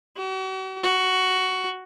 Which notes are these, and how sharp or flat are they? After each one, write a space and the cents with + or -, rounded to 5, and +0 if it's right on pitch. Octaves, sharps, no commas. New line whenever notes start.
F#4 +45
F#4 +10